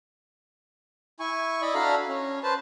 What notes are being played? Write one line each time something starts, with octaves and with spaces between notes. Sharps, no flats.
E4 G#5 C#6
E4 D5 D#5 B5
D4 F#4 A4 F5 A#5 B5
C#4
B4 C5 A5